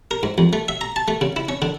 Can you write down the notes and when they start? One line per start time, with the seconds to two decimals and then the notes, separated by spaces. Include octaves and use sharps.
0.11 A#4
0.23 G#2
0.38 F2
0.53 A3
0.68 E5
0.81 A#5
0.96 A5
1.08 A3
1.21 C#3
1.36 E4
1.49 C#4
1.62 D3